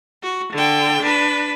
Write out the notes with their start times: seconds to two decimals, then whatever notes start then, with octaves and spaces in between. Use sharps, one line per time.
0.23 F#4
0.53 D3 G5
1.02 D4 B4